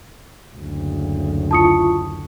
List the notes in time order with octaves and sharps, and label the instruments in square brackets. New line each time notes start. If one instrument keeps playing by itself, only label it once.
[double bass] F#1 D2
[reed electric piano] E4 F4 C#6 [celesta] A5 D#6 C#7